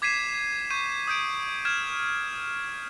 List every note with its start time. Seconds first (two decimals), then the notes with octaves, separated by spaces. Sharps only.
0.02 D6 G#6 B6 C7 D#7 E7
0.71 C#6 G6 D#7
1.07 D#6 G6 D7
1.65 F6 G#6 E7